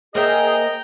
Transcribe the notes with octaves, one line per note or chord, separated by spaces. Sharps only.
A#3 G#4 C5 D#5 E5 G5 A#5